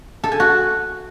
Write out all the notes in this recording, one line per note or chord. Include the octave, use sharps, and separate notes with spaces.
A4
G#5
F#4